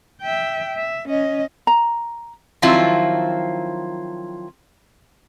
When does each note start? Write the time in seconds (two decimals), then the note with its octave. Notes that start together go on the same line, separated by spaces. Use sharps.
0.22 E5 G5
0.77 E5
1.08 C#4 D#5
1.67 A#5
2.62 D#3 F3 F#3 C4 E4 F4